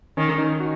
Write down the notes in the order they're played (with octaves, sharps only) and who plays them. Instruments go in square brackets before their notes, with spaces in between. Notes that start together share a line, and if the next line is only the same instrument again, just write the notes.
[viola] D#3 [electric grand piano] C#4
[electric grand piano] D#4
F#4